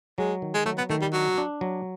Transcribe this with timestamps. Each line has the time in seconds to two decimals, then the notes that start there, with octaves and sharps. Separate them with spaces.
0.18 F#3 G#3
0.42 D#3
0.54 G#3
0.66 F#3 A3
0.78 B3
0.90 D#3 A3
1.01 G3
1.13 F#3 D4
1.38 D4
1.61 F#3